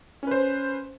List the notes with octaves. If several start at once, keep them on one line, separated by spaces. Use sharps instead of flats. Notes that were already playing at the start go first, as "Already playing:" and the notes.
C#4 B4 C5